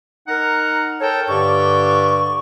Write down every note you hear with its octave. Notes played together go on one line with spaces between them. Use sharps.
D#4 A#4 F#5 A#5
A4 A#4 C#5 G5 A5
G2 D3 G4 D5 C#6